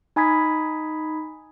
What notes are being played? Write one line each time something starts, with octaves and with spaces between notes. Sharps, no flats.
D#4 G#5 B5 D#6 G#6 B6